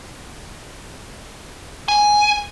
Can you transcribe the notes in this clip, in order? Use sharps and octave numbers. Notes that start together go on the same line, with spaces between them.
G#5